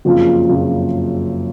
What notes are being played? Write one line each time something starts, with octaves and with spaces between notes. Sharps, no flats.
F#1 F2 C#3 F3
F#1 F2 C#3 F3